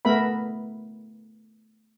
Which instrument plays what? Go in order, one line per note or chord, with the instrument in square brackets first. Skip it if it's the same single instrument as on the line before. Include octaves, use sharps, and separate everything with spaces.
[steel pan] A3 B3 A#4 E5 B5